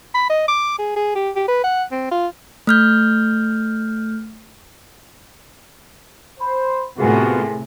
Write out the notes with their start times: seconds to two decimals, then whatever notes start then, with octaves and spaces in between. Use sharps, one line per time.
0.14 B5
0.30 D#5
0.48 D6
0.79 G#4
0.96 G#4
1.15 G4
1.36 G4
1.48 B4
1.64 F#5
1.92 C4
2.11 F4
2.67 A3 F6 G6
6.40 C5 B5
6.98 A2 C3 B3 F4 F#4 G#4 A#4 G#5